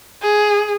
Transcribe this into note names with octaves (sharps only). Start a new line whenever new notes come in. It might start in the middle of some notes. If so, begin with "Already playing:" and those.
G#4